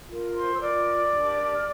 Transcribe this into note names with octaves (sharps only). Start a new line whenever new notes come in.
F4 A#4
C5 C6
E6
F4 A#4 D5 D6
D4 G4 A#4
F6